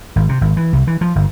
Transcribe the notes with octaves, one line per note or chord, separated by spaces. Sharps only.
G#1
C3
G#1
E3
C2
E3
F3
G1